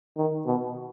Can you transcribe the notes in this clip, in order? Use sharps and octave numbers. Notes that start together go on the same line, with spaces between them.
D#3
B2